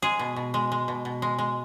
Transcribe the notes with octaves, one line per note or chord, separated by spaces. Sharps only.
G#3 G#4
B2
B2
G#3
G#3
B2
B2
G#3
G#3